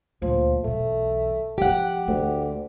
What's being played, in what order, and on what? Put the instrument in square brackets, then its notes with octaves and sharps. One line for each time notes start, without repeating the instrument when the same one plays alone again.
[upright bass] D2 A#2 [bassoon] F3
[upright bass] B1 E2 [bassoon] A3
[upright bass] F3 C#4 [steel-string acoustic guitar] G4 F#5
[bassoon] D2 [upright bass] D3 A3